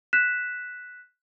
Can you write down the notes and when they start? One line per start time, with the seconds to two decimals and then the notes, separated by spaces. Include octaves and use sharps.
0.13 F#6 B6 E7